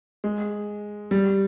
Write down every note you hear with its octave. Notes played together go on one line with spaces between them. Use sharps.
G#3
G3